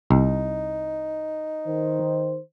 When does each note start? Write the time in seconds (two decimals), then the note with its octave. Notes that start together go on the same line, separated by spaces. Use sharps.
0.11 C2 D#4
1.67 D#3 C5